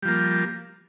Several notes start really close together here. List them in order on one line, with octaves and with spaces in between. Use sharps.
G3 F3 A#3